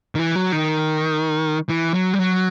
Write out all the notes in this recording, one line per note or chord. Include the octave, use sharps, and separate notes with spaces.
D#3
E3
F#3
D#3
E3
F#3
G3
F#3